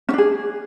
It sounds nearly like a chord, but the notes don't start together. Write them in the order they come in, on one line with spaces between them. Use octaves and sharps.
C#4 D4 G#4